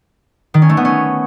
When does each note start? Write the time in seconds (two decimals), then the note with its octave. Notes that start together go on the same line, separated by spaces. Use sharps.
0.54 D#3
0.62 C#4
0.70 A3
0.77 B3
0.85 C#4